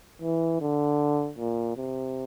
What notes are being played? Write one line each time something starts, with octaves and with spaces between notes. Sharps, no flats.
E3
D3
A#2
C3